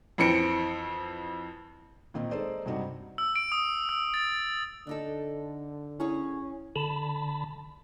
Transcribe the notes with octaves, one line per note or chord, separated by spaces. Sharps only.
F2 E3 C4 C#7 D7
A#2 D#3 C4 D#4
G#3 D#4 A4 C5 D5
G2 C3 C4 D#4 F#4
E6
D7
D#6
E6
A6
D3 D4 D#4 A4
C#4 E4 G#4 C#5 F#5
D3 A5 B5